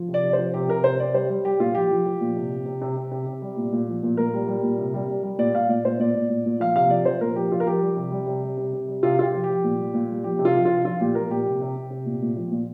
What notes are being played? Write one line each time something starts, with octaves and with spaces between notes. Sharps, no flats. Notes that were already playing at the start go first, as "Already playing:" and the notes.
Already playing: F3
C3
D5
C3
C5
F3
C3 G4
C3 A#4
C3 C5
C3 D5
G3 C5
G3
G3 G4
A#2 F4
F3 G4
F3
F3
A#2
C3
C3
C3
C3
C3
C3
C3
G3
A#2
A#2
F3
A#2
A#2 A#4
G3
G3
A#2
C3
G3
G3
G3
A#2 D5
A#2 F5
A#2 D5
A#2 C5
A#2 D5
A#2
A#2
A#2
F3 F5
C3 F5
F3 D5
F3 C5
A#2 A#4
F3 G4
F3 F4
A#4
F3 G4
G3
C3
G3
C3
G3
C3
C3
G3
C3 F4
C3 F4 G4
F3
G4
F3
A#2
G3
A#2
G3
F3 G4
C3
F4
F3
C3 F4
F3 F4
A#2 G4
F3 A#4
A#2 G4
C3
C3
C3
C3
A#2
A#2
F3
A#2